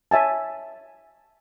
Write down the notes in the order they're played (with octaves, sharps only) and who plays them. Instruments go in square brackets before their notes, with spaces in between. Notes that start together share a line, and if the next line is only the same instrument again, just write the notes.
[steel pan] C#5 E5 G#5 A5